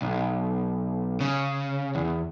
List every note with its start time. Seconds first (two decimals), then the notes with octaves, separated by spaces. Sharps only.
0.02 B1
1.20 C#3
1.95 E2